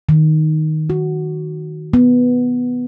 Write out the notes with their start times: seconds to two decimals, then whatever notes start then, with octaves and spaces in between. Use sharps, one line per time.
0.09 D#3
0.90 F#4
1.93 B3